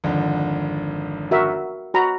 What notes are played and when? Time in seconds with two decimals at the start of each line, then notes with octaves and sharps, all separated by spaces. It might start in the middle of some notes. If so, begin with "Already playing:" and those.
0.04 G#1 F2 D3
1.31 F#4 A#4 E5
1.94 F#4 A#5 B5